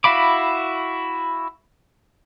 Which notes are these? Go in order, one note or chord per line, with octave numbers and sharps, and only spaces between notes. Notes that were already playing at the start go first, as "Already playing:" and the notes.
E4 F#4 F5 B5 D6